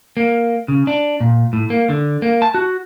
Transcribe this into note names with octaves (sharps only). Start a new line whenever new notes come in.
A#3
C#3
D4
A#2
A2
A#3
D3
A#3
A5
F#4